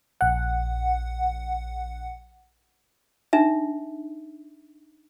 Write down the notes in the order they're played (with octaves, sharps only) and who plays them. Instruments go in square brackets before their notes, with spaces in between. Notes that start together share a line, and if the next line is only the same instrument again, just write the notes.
[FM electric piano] A#1 F#5
[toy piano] D4 D#4 E5